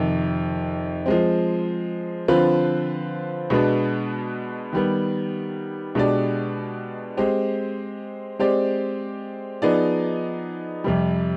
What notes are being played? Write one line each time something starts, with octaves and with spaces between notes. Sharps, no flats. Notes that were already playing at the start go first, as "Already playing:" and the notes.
Already playing: F2 C3 D#3
F3 G#3 C4
D3 F3 C4 F4 B4
B2 G#3 B3 D4
D#3 G3 B3
B2 G#3 D4 G4 D5
G#3 C4 G4
G#3 C4 G4 D5
F3 B3 D#4 G#4 D5
F2 C3 G3